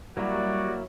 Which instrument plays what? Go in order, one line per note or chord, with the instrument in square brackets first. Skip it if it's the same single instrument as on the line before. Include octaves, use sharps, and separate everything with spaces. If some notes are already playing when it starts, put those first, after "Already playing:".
[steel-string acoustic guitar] F#3 E4 [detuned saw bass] G3 [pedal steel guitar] A#3 [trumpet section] F#4 D5